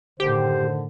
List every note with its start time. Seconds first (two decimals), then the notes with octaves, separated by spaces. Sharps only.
0.20 F#2 A2 D3 D#3 G4 C5